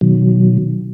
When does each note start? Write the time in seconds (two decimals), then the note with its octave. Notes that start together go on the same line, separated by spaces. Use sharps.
0.01 B2 D#3 F#3